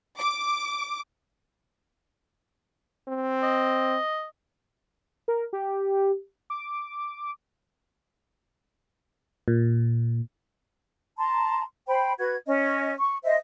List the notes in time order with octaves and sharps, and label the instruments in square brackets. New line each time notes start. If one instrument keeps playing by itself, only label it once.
[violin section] D6
[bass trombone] C4
[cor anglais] D#5
[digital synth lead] A#4
G4
D6
[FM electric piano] A#2
[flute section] A5 A#5 C6
C5 G5 B5
F#4 B4 G#6
C#4 D#5
C#6
C5 D#5 E5